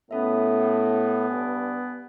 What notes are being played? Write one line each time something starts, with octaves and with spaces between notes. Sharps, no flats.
A2 B3 C#4 A4 E5
G2 G#5